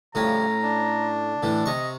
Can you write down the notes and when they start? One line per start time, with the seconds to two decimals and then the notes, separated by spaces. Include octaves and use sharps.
0.15 A2 C#3 F3 G3 C#4 A#5
0.63 D4
1.43 A2 E3
1.66 C3 D#5 C#6